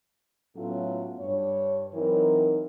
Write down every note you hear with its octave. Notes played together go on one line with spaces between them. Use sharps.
A2 F#3 A3 B3 C#4 F4
G2 C#5
E3 F#3 C4 D#4 A#4